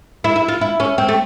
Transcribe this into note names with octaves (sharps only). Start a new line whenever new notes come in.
E4
E4
F4
E4
C#4
C4
A3